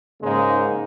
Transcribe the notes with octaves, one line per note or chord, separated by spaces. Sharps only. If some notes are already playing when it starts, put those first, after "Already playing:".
G#2 C#3 G#3 A#3 D#4